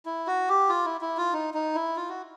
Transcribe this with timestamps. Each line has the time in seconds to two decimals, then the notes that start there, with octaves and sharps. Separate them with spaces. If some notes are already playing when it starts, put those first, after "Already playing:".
0.06 E4
0.27 F#4
0.49 G4
0.69 F4
0.86 E4
1.01 E4
1.17 F4
1.33 D#4
1.54 D#4
1.75 E4
1.97 F4
2.09 F#4